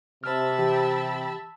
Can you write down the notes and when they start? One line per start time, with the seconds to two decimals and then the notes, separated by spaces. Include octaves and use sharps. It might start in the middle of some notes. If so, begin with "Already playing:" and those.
0.24 C3 C5 E5 A5 B5 F6
0.58 E3 G4 G5